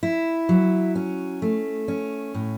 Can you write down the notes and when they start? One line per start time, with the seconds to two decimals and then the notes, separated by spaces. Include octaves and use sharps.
0.03 E4
0.49 F#3
0.95 C#4
1.42 A3
1.88 C#4
2.34 A2